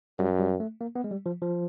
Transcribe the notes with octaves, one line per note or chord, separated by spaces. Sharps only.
F#2 G3
G3
A3
A#3
B3
G#3
G3
F3
F3